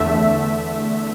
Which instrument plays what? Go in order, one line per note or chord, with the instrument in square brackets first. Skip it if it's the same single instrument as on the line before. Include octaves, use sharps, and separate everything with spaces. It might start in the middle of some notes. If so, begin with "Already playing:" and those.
Already playing: [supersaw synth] E2 D3 A3 E5